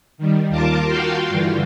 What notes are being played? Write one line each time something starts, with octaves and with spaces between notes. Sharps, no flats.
D#3 G3
D#2 F4 A#4 A5 D6
F4 F#4 F5 G5 C6
G2 D3 E3